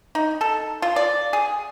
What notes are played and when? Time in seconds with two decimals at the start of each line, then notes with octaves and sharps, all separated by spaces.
0.15 D#4
0.41 A4
0.82 F4
0.96 D5
1.33 G#4